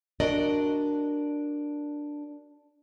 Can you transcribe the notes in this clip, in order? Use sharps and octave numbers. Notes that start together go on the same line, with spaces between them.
D4 F#4 A#4 D5 D#5